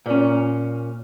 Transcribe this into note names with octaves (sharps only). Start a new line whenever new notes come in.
A#2 C#4